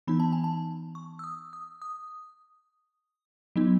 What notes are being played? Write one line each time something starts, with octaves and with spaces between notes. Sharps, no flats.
E3 B3 D#4 B5
A5
G#5
A5
C#6
E6
D#6
D#6
D#6
F#3 B3 D#4